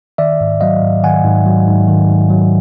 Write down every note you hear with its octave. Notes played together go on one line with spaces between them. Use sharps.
D#3 D5 E5
G#2
F#3 D#5 F5
G#2
D#3 F#5 G#5
G#2
F#3
G#2
D#3
G#2
F#3